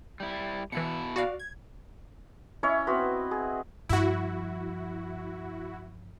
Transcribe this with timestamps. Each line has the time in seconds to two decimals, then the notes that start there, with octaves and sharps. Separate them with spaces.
0.20 G3 E4
0.72 B2 E3 E4 C#7
1.16 F#4 D5 F5
1.40 G#6
2.63 C#4 E4 C#5 D#5
2.87 B3 C4 F#4 B4
3.31 G#4
3.89 G2 F3 E4 F#4